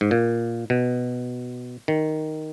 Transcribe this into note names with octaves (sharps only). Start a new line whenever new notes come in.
G#2
A#2
B2
D#3